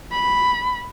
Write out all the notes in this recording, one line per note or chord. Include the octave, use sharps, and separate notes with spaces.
B5